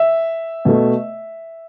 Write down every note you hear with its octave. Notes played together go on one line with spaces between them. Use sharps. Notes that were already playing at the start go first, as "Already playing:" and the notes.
Already playing: E5
B2 A3